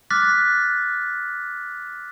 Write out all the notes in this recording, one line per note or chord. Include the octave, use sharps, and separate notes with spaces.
D6 F6 F#6 A6 B6